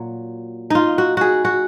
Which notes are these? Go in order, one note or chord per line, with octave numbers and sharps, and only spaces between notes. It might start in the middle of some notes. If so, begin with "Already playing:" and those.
Already playing: A#2 F#3
D#4 F4
F#4
F#4 G#4
F#4